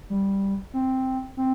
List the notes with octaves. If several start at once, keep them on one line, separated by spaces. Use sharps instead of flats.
G3
C4
C4